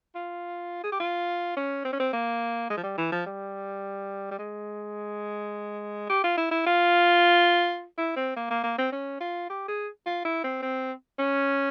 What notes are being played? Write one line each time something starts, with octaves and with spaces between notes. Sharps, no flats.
F4
G#4
G4
F4
C#4
C4
C#4
C4
A#3
G#3
F3
G3
E3
F3
G3
G3
G#3
G4
F4
E4
E4
F4
E4
C4
A#3
A#3
A#3
C4
C#4
F4
G4
G#4
F4
E4
C4
C4
C#4